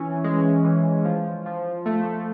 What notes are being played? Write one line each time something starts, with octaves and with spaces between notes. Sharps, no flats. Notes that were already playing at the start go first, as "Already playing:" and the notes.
Already playing: E3 C#4
G#3
E3
F3
F3
A3